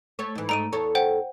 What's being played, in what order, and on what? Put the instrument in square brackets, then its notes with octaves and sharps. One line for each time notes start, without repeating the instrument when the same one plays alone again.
[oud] A3 C#5
G#2 E3
[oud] G#2 A3 D#5 [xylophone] A#5 D7 D#7
[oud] E2 A4 C#5
[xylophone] C5 F#5 G5